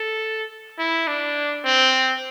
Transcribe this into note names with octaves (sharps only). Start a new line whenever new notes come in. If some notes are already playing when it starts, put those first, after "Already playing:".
Already playing: A4
E4
D4
C4